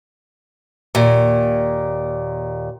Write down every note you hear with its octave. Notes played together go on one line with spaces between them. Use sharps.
D#2 A#2